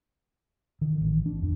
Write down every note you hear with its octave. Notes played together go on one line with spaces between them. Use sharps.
D#3
A1
D4
F2